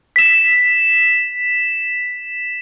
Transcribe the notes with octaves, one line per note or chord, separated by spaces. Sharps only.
B6 E7